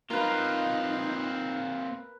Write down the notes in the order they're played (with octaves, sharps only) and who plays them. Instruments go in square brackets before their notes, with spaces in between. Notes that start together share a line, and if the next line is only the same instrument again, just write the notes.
[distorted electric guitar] A#3 C4 [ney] D#4 [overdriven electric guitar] F4 [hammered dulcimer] A#4 B4